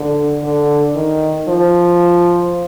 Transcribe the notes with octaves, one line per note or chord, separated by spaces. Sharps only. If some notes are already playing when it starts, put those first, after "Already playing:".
Already playing: D3
D3
D#3
F3